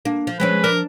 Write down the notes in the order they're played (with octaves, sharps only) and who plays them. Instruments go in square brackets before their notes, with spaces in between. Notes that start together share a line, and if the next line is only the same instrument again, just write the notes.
[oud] A#3 [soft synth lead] D4
[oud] F3
[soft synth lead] F3 [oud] G#3 C4 C#4 [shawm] B4
[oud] D4 [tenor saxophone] A#4